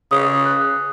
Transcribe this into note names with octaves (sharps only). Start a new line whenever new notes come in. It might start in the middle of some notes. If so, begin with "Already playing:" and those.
C#3 D#6
F#6